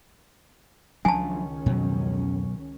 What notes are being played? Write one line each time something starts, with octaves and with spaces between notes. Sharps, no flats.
C#2 D#3 F3 F#3 C#4 D4 G#5 A5
F2 B2 F#3